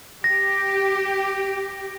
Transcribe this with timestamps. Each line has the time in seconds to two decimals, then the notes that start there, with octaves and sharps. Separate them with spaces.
0.24 G4 A#6